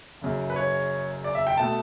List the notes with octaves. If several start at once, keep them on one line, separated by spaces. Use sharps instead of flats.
F#1 F#2 C#3
B4
C#5
D5
E5
G5
B2 A3 A5